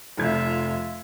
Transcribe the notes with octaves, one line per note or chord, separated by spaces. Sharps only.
F1 F3 F4 E5 G#6